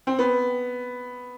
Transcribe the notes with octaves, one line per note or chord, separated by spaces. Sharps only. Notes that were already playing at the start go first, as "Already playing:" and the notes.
C4
B3